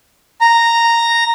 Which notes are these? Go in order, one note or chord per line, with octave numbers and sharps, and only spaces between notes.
A#5